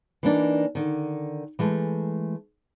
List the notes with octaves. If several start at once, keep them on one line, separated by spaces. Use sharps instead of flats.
E3 A#3 D4 D#4
D3 D#3
E3 G#3 A3